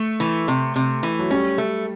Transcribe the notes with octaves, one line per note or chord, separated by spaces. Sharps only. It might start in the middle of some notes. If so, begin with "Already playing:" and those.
Already playing: A3
E3
C3
C3
E3
F#3
G3 C#4
A3